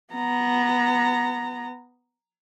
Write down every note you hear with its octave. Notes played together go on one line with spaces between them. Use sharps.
B3 A#5